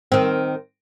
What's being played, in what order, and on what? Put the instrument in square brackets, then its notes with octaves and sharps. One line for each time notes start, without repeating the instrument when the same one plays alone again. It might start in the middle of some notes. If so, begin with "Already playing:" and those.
[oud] D#3 C4